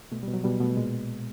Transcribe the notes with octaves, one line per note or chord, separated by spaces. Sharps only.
B2 A3
G3
B2
F#3
B2 G3
B2 A3
A#2 G#3